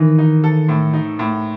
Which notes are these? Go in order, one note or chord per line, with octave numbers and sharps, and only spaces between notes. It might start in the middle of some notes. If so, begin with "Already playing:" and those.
Already playing: D#3 E3
D#4
A4
A2
D#4
A2